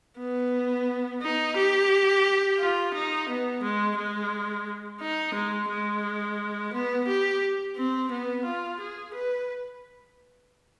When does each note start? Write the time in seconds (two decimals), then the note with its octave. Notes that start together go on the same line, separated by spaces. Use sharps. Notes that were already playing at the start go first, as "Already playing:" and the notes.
0.19 B3
1.22 D#4
1.57 G4
2.60 F4
2.94 D#4
3.29 B3
3.63 G#3
3.97 G#3
5.01 D#4
5.35 G#3
5.69 G#3
6.73 B3
7.08 G4
7.77 C4
8.11 B3
8.45 F4
8.80 G#4
9.14 B4